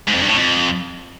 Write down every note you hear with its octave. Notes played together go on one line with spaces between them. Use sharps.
G#2
F2
G2
A2
F2